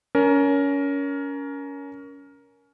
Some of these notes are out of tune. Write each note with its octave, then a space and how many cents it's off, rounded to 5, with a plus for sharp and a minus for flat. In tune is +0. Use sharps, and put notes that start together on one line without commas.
C#4 +25 A#4 +10